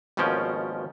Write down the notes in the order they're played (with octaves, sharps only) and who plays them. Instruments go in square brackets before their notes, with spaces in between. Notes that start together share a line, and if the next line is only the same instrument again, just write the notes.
[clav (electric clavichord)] G#1 D#2 B2 F3 C#4 G5